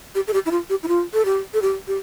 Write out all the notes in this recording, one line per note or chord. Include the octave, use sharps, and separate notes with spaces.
G4
A4
G4
E4
F4
G4
E4
F4
A4
G4
A4
G4
G4